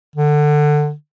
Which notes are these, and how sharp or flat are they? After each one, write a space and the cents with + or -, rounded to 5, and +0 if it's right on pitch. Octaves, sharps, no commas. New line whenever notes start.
D3 +20